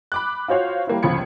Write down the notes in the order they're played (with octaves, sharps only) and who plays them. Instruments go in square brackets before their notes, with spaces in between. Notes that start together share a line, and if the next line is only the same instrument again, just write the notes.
[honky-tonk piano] B5 D6 F#6
F4 F#4 C5 C#5 F5
G3 A#3 E4
G1 C#2 F3 B5 G#6 C#7